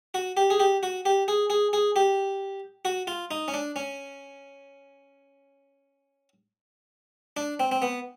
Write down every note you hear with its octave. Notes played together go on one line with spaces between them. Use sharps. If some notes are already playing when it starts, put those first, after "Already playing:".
F#4
G4
G#4
G4
F#4
G4
G#4
G#4
G#4
G4
F#4
F4
D#4
C#4
D4
C#4
D4
C4
C4
B3